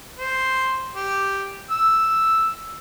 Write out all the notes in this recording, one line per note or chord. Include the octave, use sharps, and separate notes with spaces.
C5
G4
E6